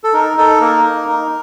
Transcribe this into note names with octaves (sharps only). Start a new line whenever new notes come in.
A4
D#4 A#4
D#4 A4
A#3 A#4
D#4
D#4